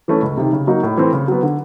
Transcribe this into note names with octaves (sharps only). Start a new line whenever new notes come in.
E3 A3 C#4
C#2
C3 D#3
C#3
F#3 A#3 D#4 F#4
A2
E3 A3 C4
C#3
F#3 B3
D3